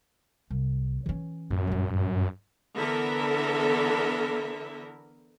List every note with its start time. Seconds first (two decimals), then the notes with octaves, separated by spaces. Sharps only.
0.50 C2
1.06 E3 C#4
1.50 F#2 A2
1.67 A#1 G2
2.76 D3 E3 B3 A4 A#4 E5